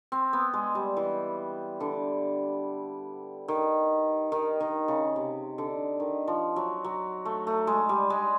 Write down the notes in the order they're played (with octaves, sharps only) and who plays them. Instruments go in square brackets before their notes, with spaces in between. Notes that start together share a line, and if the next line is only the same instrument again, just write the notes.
[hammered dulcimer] C4
B3
G#3
G3
E3
D3
D#3
D#3
D#3
C#3
C3
D3
D#3
F3
F#3
F#3
A3
A3
G#3
G3
G#3